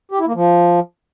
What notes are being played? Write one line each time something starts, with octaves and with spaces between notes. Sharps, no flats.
G4
E4
A#3
F3